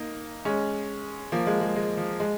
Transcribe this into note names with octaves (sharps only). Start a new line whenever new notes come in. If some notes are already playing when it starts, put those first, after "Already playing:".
Already playing: A#3 D#4
G#3 C#4
F3 A#3
G#3
G#3
G#3
F3
G#3